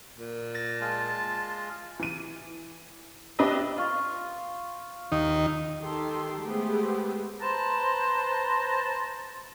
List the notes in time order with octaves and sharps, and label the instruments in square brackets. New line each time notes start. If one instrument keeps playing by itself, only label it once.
[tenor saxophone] A#2
[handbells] A6 A#6
[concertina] G#3 F4 [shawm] A5
[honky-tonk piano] E3 D#7
D4 G4 B4 D#5 E5
[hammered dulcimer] F4 C#6
[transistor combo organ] D#2 D#3 D#4
[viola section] D#3 G4 A4 C6
G#3 A3 B3 G4 G#4 C5
[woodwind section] B4 C5 A5 A#5